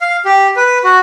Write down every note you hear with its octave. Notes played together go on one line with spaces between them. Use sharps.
F5
G4
B4
F#4